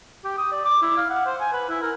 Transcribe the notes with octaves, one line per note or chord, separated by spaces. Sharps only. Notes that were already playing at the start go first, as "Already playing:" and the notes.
G4
D#6
D5
D6
E4
F5
F#5
C5
G#5
B4
E4
A#4